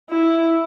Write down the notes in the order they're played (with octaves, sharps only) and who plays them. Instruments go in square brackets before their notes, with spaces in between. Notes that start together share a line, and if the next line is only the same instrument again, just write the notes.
[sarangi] E4